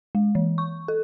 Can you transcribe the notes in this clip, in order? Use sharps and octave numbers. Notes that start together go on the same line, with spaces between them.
G#3
E3
C#6
A4